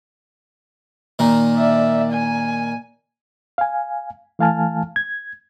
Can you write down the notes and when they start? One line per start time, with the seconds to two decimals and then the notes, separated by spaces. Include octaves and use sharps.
1.19 A#2 D#3
1.57 D5 E5
2.12 G#5
3.58 F5 G#5
4.39 E3 A3 F5 G#5 A5 F6
4.96 G#6